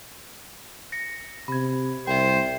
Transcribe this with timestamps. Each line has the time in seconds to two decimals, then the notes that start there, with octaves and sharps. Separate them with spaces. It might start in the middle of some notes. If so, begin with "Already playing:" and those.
0.92 A#6 C#7
1.48 C3 B5 G#6
2.07 C2 C5 E5 G5